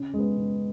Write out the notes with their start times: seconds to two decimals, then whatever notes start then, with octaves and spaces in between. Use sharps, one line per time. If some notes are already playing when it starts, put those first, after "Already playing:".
Already playing: C#3
0.14 G#3
0.19 B3
0.37 C#3